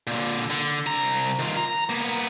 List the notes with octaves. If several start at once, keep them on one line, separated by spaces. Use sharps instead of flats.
A#2 D3
D3
C2 A#5
D#3 F4
A#5
A#3 B3